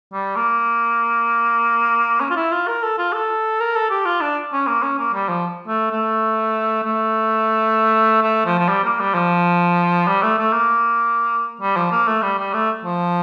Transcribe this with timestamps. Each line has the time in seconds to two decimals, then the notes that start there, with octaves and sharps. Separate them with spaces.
0.13 G3
0.36 A#3
2.20 C#4
2.30 F4
2.36 E4
2.52 F4
2.67 A#4
2.83 A4
2.98 F4
3.13 A4
3.60 A#4
3.75 A4
3.90 G4
4.05 F4
4.21 D4
4.53 C#4
4.67 A#3
4.83 C#4
4.99 A#3
5.13 G3
5.29 F3
5.68 A3
5.91 A3
6.84 A3
8.22 A3
8.45 F3
8.58 F3
8.68 G3
8.84 A#3
8.99 G3
9.14 F3
10.07 G3
10.23 A3
10.38 A3
10.53 A#3
11.61 G3
11.76 F3
11.92 A#3
12.07 A3
12.22 G3
12.38 G3
12.54 A3
12.84 F3